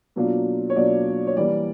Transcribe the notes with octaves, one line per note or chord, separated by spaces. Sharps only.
B2 F#3 A#3 D4 F4
C#5
B2 F#3 A#3 D4 F4 D5
C#5
E3 G3 A#3 D5